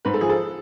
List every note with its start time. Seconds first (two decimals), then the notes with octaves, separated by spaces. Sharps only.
0.05 G#2 B4
0.14 A4
0.21 F3 G#4
0.30 A4